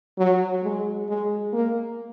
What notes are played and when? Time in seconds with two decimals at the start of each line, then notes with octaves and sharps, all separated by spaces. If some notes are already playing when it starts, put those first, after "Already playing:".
0.18 F#3
0.63 G#3
1.08 G#3
1.53 A#3